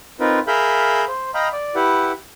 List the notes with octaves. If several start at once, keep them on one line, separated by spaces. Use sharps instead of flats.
C4 D#4 F4 A#4 B4
G#4 A#4 E5 F5 B5 G6
C5
D#5 F5 G5 A#5 B5
D5
E4 G4 B4 F#5